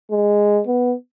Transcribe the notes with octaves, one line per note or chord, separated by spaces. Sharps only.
G#3
B3